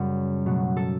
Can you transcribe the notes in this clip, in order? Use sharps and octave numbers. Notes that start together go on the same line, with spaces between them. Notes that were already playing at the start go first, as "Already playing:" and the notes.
Already playing: F#2 C#3 G3 C#4
B2 F#3 A3
A4